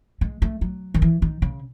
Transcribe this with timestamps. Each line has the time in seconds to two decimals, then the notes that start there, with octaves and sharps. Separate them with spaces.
0.21 G#3
0.42 A3
0.61 F#3
0.94 D#3
1.02 E3
1.22 D#3
1.42 C#3